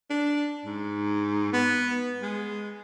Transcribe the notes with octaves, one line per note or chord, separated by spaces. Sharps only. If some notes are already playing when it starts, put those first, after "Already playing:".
D4
G#2
B3
G#3